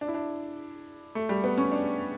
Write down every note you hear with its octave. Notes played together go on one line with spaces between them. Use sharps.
D4
E4
D4
A3
G3
B3
C#4
D4